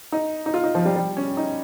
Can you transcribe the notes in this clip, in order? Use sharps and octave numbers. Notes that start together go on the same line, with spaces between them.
D#4
D#4
F4
D#4
F3
G3
G3
C#4
D#4